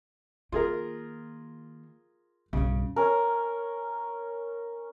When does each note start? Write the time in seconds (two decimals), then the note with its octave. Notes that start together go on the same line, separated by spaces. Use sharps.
0.52 D#3 A#3 F4 G#4 A#4
2.53 B1 G2 C#3
2.96 C#4 A#4